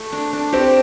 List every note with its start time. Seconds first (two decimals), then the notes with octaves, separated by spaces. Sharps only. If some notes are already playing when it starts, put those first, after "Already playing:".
Already playing: A3
0.12 D4
0.33 D4
0.52 C4 G4